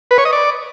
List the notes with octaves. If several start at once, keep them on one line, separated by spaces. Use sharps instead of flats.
B4
C#5
D#5
D5